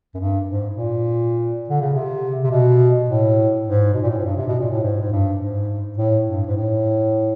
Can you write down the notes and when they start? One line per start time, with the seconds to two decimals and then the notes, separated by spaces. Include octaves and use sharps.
0.15 F#2
0.20 G2
0.48 G#2
0.77 A#2
1.69 D3
1.81 C#3
1.94 C3
2.44 C3
2.51 B2
3.09 A2
3.67 G#2
3.94 B2
4.02 A#2
4.10 A2
4.17 G#2
4.25 G2
4.37 C3
4.48 B2
4.59 A#2
4.71 A2
4.83 G#2
5.01 G#2
5.12 G2
5.40 G#2
5.98 A2
6.27 G2
6.46 G#2
6.57 A2